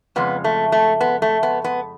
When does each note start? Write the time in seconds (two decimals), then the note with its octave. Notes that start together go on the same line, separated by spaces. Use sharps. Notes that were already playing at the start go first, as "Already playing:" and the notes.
0.16 F2 C#3 G#3 B3
0.44 A3
0.72 A3
1.01 B3
1.22 A3
1.43 B3
1.64 B3